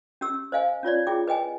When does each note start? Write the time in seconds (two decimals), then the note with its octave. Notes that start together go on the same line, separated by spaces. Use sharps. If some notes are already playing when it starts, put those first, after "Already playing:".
0.21 C#4 G4 E6
0.52 C5 D#5 F5 G#5
0.83 C#4 F4 C#5 D5
1.07 E4 F4 G#4 G5 D6
1.28 B4 D#5 G5 G#5